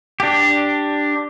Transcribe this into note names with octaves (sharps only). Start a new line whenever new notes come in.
D4 G4